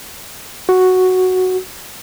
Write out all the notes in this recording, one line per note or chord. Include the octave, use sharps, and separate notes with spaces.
F#4